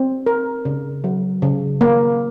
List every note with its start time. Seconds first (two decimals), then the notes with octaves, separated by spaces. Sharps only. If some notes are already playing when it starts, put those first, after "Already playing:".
Already playing: C4
0.26 A#4
0.65 C#3
1.04 F#3
1.42 C#3
1.81 A#3